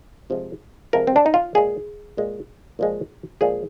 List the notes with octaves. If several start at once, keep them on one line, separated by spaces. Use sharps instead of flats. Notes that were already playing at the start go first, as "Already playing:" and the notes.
C3 F3 G#3
C3 F3 G#3 A#4
C4
D4
D#4
F4
A#2 G#3 G#4
A#2 G#3
A#2 F3 G#3
A#2 F3 G#3 G#4